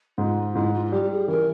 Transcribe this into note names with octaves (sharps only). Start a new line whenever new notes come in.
G#2 F4
G#2 E4
F4
F4
G3 G4
G4
G#4
E3 A#4